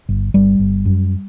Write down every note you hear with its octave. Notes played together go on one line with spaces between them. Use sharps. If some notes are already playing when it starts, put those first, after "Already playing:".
G1
G1 G3
G1
F#2